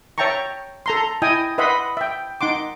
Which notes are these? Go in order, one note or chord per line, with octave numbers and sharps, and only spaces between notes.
C#5 E5 G5 A5 A#5 C#6
A4 A#5 C6
E4 D#5 G5 G#5 D#6
B4 D#5 E5 F#5 B5 C6
E5 G5
D#4 F#5 C6 D6